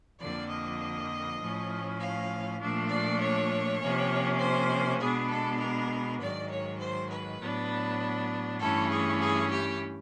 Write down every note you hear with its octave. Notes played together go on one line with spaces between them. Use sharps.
F2 D3 F3 A#3 D5
D#5
A2 F3 A3 C#4
F5
A#2 F3 A3 D4
D5
C#5
C3 F3 A#3 C#4
C5
B2 G#3 B3 D4 G#4
A4
A#4
G#2 D#3 F#3 D5
C#5
C5
B4
A2 F#3 B3 D4
G2 E3 A3 C#4 A4
G#4
G#4
G4